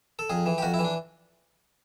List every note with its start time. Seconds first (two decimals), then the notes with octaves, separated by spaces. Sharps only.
0.19 A4
0.30 F2 G#4
0.46 E3
0.58 G4
0.62 F2 F#4
0.74 E4
0.79 E3
0.84 D4